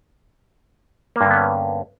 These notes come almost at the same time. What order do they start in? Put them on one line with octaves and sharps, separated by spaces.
A#3 G2 D3 B3 C#4